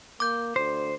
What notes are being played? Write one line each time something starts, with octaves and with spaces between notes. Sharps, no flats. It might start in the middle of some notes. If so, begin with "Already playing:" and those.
A#3 D6 G6
D2 C5